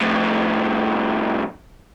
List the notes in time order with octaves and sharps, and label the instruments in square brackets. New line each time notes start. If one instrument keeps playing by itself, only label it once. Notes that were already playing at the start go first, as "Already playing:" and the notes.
[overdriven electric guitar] F2 A2